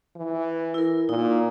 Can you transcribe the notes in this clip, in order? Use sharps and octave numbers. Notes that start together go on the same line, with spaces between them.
E3
E4 A#4
A#2 D#4